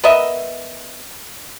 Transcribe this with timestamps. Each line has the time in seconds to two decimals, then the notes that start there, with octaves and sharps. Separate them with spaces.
0.04 B3 A#4 D#5 E5